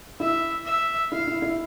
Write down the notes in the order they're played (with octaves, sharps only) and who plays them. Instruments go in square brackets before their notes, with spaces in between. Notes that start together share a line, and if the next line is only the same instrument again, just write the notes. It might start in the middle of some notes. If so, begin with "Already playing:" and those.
[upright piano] E4 [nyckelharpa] E5
[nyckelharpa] E5
[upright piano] E4 [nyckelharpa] F5
[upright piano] E4
E4